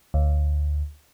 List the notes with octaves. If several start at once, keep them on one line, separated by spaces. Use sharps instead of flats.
D2